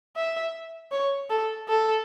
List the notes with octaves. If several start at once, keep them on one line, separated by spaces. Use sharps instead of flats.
E5
C#5
A4
A4